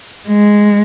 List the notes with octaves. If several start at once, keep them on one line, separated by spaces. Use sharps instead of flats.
G#3